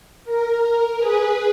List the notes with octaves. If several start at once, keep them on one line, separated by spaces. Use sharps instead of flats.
A#4
G#4 B4